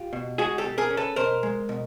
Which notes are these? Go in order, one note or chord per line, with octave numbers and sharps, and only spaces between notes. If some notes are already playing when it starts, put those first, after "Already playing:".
Already playing: F4 G4
B2
G#3 F#4 G#4
G4 A4
B2
G#4 A#4
C#4
A4 B4
B2 A#4 C5
G#3
B2